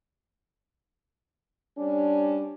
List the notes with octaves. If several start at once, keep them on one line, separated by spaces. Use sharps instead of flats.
G3 C#4 D4